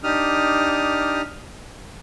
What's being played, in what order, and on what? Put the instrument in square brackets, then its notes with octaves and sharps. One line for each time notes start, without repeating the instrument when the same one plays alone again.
[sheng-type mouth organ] D4 D#4 G4 D#6 F6